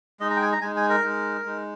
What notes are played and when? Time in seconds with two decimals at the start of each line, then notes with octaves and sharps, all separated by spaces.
0.20 G#3 D#4 D#5
0.30 A#5
0.36 G5
0.42 G#5
0.52 A#5
0.62 G#3 D#4 G#5
0.77 G#5
0.90 A#4
1.04 G#3 D#4
1.46 G#3 D#4